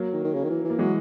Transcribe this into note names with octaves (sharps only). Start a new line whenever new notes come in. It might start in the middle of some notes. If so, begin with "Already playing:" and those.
Already playing: F#3 A#3
D#3
D#3
C#3
D#3
E3
E3
A#3
E3 F#3 G#3